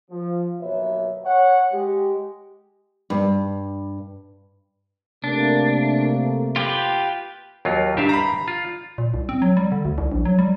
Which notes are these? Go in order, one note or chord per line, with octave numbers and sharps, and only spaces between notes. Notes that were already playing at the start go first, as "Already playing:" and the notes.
F3
D#2 B2 F#3 B4 C#5 E5
C#5 F#5
G#3 G4
G2
C3 A3 A#3 D4
F4 G4 B4
D#2 F#3 F4
G2 G4 E5 F5
A#5 B5
F4
A#2
C2
C4
F#3
G3
D3
D2
C2
A#1
F#3
G3